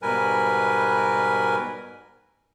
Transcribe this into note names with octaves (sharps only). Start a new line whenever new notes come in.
G#2 B2 G3 A#4 B4 G#5